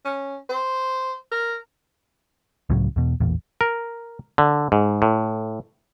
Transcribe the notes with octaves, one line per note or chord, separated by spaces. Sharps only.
C#4
C5
A#4
C#2 A2 C#3 F#3
E2 B2
A1 E2 A#2
A#4
D3
G#2
A2